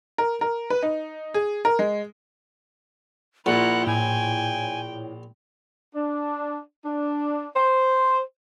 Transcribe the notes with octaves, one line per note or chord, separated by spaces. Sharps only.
A#4
A#4
B4
D#4
G#4
A#4
G#3
A#1 E4 F4 A#4 F#5
A2 G5 G#5
D4
D4
C5